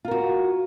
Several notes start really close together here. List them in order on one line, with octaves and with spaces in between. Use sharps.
F4 A#4 F#4